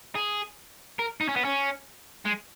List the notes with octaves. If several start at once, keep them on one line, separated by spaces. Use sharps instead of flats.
G#4
A#4
D#4
C#4
B3
C#4
G#3